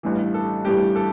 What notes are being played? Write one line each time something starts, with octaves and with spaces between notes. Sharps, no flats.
A1 G2 E3
A4
A1 G2 E3 G4
A4